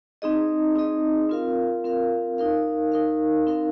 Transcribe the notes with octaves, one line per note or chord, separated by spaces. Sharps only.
C4 D#4 G#4 D#5
C4 D#4 G#4 D#5
C4 F4 A#4 F5
C4 F4 A#4 F5
D#4 A#4 F5
D#4 A#4 F5
C4 D#4 A#4 F5